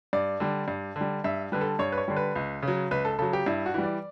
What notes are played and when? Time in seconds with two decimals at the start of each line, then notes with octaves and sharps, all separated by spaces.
0.13 G2 D5
0.40 D3 G3
0.68 G2
0.96 D3
1.01 G3
1.24 G2 E5
1.52 D3 G3 B4
1.61 A4
1.79 G2 C#5
1.92 B4
1.98 C#5
2.08 D3 G3
2.16 B4
2.36 C#2
2.63 C#3 F#3
2.91 C#2 B4
3.05 A4
3.19 C#3 F#3 A4
3.33 G4
3.46 G2 E4
3.66 F#4
3.74 E3 G3
3.83 D5